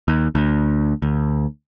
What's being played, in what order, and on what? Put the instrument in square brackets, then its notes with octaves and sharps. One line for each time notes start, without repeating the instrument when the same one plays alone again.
[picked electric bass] D#2
D2
D2